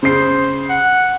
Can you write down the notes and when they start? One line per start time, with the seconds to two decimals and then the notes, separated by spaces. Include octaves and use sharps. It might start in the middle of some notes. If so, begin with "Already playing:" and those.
0.03 C#3 C5 C7
0.69 F#5